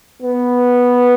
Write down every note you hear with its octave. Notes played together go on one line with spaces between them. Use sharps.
B3